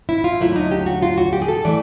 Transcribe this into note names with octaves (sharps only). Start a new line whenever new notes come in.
E4
F4
D#2 D3 F#3 A3 E4
D#4
G4
F#4
F4
F#4
G4
G#4
A4
E3 A3 D5